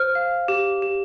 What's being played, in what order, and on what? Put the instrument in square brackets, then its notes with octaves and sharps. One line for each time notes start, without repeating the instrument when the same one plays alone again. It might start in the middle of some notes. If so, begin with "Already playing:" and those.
Already playing: [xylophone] C5 F6
F5
G4
G4